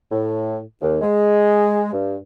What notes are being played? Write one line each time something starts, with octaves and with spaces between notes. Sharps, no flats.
A2
D#2
G#3
G2